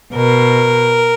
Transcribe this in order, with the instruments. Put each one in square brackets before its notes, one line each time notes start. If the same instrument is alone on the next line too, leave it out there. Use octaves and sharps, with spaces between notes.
[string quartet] B2 A#4